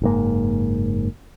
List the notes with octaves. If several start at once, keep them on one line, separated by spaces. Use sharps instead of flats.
F#1 G#2 A#3